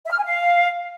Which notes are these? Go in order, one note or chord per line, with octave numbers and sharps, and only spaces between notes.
E5
F6
G#5
F5